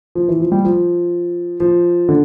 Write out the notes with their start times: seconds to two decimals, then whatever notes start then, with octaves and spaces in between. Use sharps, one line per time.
0.15 F3
0.28 E3
0.40 F3
0.52 G3
0.65 F3
1.60 F3
2.09 D3